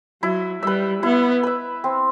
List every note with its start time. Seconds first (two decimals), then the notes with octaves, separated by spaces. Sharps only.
0.22 F#3 E4
0.63 G3 B4 E5
1.03 B3 E4
1.43 B4 E5
1.84 C4